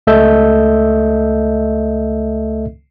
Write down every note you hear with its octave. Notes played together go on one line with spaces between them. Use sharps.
C#2 A3 A4 D#5 E5 G6